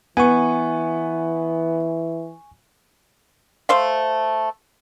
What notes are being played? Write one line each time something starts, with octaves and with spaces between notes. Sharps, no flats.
E3 B3 G#5 C#6
A3 C5 F5